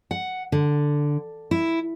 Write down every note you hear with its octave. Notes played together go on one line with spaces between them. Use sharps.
F#5
D3
E4